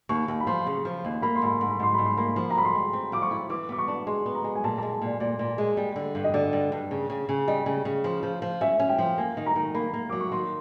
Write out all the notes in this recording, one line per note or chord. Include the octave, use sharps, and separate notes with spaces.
D#2 C#6
D#2
B5
F3 C6
C#3
F3
D#2
A#3 B5
C6
G#2 B5
G#2 C6
B5
G#2 C6
G#2 B5
C6
A#3 B5
F3 B5
A#5
C4 B5
C6
G#3
C4
F3 D6
C#6
E4
E3 D6
B3 D6
C#6
D4
G#3 C6
B3
A#5
G#3
G#5
A#2 A5
G#3 A5
G#5
A#2 D5
A#2 D5
A#2
G#3
G3
D3
G2
D#5
D3 D5
G2
G2
C#3
C#3
C#3
G3 D#5
C#3
C#3
F3
F3
F3
C#4 E5
C#4
G5
F3
A#3 G#5
D#3
A#5
D#3
A#3 B5
A#3
F#3 D6
C#6
D#3 C6